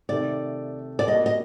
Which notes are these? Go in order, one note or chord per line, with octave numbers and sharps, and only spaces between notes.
C3 D#3 A3 D5
D5
G3 A#3 D4 F#4 D#5
D#5